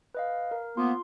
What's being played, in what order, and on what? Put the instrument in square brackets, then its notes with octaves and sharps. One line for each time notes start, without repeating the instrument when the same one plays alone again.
[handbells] B4 D#5 F5
A#4
[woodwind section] F3 A#3 B3 [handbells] F4 C6